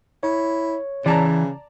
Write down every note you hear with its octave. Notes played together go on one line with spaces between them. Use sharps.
E4 C#5
C#3 E3 D5 A5 A#5